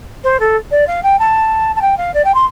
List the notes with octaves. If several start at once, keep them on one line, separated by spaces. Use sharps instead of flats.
C5
A4
D5
F5
G5
A5
A5
G5
F5
D5
G5
C6